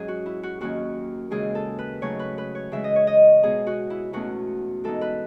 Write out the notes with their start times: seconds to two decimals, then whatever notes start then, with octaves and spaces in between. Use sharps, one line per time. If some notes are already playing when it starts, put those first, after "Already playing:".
Already playing: G#2 F#3 C#4 G#4
0.08 F#4
0.26 E4
0.43 F#4
0.61 D#2 D#3 F#3 C#4 F#4
1.31 D#2 C#3 E3 G#3 G#4
1.55 A4
1.79 B4
2.02 C#3 F#3 A3 D#4 C#5
2.19 B4
2.38 B4
2.55 C#5
2.72 C#3 E3 G#3 E5
2.84 D#5
2.96 C#5
3.07 D#5
3.43 B2 G#3 D#4 G#4
3.67 F#4
3.90 E4
4.13 E2 B2 A3 C#4 F#4
4.84 G#2 E3 B3 D#4 A4
5.01 B4